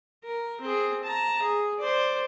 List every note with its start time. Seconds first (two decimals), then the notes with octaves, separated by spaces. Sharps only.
0.24 A#4
0.61 C4 G#4
1.04 A5 A#5
1.42 G#4
1.79 C5 D5